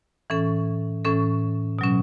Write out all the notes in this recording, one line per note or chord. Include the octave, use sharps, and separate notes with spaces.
A2 E3 C#4 A4
A2 E3 C#4 A4
B2 F#3 C#4